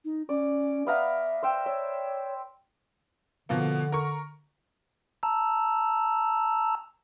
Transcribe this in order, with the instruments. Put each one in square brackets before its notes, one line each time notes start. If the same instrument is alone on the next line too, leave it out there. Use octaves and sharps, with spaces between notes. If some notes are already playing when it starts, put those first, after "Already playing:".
[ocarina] D#4
[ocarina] C#4 [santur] D5
[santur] B3 F5 A#5 [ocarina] E5
[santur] C5 E5 G5
[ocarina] C#5 [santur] E5
[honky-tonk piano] B2 F3 A#3 [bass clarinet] D3
[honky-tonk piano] A#4 C#6
[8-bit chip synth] A5 A#5 E6